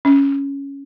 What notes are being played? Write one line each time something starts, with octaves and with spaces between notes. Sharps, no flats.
C#4